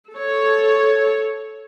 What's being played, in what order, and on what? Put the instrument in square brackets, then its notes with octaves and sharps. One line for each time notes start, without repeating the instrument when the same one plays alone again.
[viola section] A4 C#5